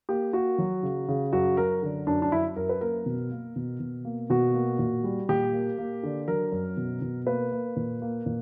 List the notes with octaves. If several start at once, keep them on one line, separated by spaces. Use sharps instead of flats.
A#3 G4
A#3 F#4
F#3
C#3
C#3
F#2 F#4
F#2 A#4
D3
F#2 D4
D4
F#2 E4
F#2 A#4
B4
A#3 A#4
B2
A#3
B2
B2
A#3
B2 F#4
A#3
A#2
G3
A#2 G4
A#3
A#3
D3
F#3 A#4
F#2
B2
B2
A#3 B4
A#3
A#2
A#3
A#2